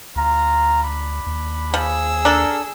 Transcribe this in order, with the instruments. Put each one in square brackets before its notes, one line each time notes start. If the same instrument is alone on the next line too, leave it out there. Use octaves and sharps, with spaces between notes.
[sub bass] D2 [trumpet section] F4 A#5
[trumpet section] D4 B5
[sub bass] D#2
[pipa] F3 [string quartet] G#4 E6
[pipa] D4 A4 [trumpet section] A#4